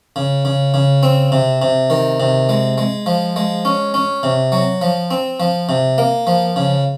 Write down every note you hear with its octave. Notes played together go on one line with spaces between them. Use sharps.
C#3
C#3
C#3
C4
C3
C3
D#3
C3
G#3
G#3
F3
G#3
C#4
C#4
C3
F#3
F3
C4
F3
C3
A#3
F3
C#3